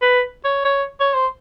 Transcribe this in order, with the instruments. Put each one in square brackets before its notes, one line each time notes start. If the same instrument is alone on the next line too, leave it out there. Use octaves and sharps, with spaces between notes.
[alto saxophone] B4
C#5
C#5
C#5
C5